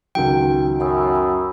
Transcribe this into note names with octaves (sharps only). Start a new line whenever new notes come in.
C#2 D#3 F#3 G5
F#2 B5 D#6 E6